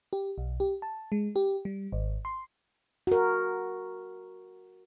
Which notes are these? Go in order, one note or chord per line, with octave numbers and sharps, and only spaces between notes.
G4
B1
G4
A5
G#3
G4
G3
G#1
C6
F#4 A#4